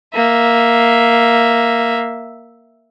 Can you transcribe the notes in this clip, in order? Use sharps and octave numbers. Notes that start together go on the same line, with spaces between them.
A#3 E5